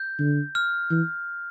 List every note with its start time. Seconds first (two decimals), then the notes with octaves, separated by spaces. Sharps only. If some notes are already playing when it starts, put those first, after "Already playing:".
Already playing: G6
0.19 D3
0.55 F6
0.91 E3